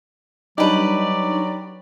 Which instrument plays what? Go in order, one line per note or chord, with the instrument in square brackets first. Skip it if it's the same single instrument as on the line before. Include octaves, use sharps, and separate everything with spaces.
[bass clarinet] F#3 [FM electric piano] G3 D4 D#4 [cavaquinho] G4 B4 [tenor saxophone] D5